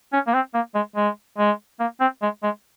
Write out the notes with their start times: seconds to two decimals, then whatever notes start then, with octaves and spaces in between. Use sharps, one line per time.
0.13 C#4
0.27 A#3
0.34 C4
0.54 A#3
0.75 G#3
0.96 G#3
1.38 G#3
1.80 A#3
2.01 C4
2.22 G#3
2.43 G#3